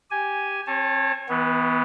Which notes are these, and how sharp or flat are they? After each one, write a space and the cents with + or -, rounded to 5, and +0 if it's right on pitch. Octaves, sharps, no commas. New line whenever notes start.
G4 +0 G#5 +0
C4 +35 C#5 -15 A5 +0
E3 -40 B3 +0